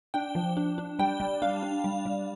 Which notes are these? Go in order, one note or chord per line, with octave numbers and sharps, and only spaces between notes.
D4 G5
F3
D4
D4
G3 G5
G3
D4 F5
D4
G3
G3